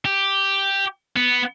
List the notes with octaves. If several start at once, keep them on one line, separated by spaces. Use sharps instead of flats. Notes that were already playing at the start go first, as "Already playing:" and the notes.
G4
B3